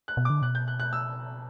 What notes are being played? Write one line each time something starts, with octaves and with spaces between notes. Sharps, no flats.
F#6
B2
D6
D3
B2 F#6
G6
F#6
F#6
E6